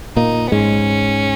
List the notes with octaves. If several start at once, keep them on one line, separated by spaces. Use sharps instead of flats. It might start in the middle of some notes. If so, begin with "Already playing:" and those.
A#2 A#3 D#4
B3
G#2 G#3 C#4